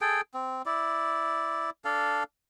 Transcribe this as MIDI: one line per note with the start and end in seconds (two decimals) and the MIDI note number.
0.01 0.21 68
0.01 0.21 69
0.01 0.21 79
0.34 0.62 60
0.66 1.70 64
0.66 1.70 74
1.85 2.23 62
1.85 2.23 69
1.85 2.23 77